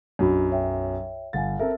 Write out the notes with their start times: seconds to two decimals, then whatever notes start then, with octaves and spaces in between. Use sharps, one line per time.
0.19 B1 F#2 D4 F#4 B5
0.51 C#5 E5 G5
1.33 G1 F5 F#5 G#5 A6
1.59 C4 A4 A#4 E5